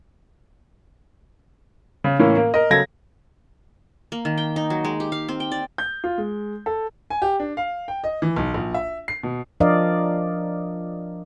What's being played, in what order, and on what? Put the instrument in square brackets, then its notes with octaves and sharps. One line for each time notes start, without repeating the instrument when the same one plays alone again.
[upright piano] C#3
A2 E3 A#3 C#4
A#3
A#4 D#5
C#3 F#3 A4 G#6 A#6
[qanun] A#3
D#3
G5
D#4
F#3
G#3
G4
F5
C4
G5
D5
[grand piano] G6
F4
G#3
A4
G#5
G4
D4
F5
G5
D#5
E3
B1
A#1
E5
C7
B2
[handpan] F3 D4 A#4 D5 D#5 F5